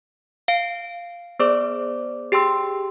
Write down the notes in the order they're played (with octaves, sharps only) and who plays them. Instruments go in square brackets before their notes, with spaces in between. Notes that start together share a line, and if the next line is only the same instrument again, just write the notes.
[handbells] F5 C7 D7
B3 G#4 C5 D5 D6
G4 G#4 G5 C6 E6